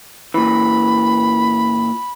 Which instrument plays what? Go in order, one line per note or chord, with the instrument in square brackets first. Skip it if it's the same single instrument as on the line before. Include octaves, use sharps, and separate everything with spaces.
[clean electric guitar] A#2 E3 [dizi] B5